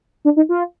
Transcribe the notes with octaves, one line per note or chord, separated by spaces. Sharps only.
D4
D#4
F4